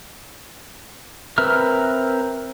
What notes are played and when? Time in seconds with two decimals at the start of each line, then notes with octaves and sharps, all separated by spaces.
1.38 C4 A#4 B4 E5 F6